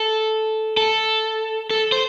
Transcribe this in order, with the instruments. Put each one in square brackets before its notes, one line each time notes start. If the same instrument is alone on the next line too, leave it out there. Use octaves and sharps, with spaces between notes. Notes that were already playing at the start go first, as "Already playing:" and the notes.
Already playing: [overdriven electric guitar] A4
A4
A4
C5